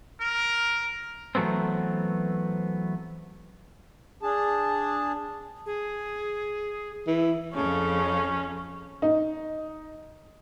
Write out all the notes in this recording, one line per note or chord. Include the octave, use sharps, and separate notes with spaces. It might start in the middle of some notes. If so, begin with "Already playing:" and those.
A#4
E3 F#3 A3 B3 C4
D4 G#4 A5
G#4
E3
F2 C#3 C#4 A4
D#4